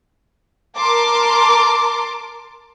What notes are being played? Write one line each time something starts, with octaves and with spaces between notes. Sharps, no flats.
A#4 A5 C6 D6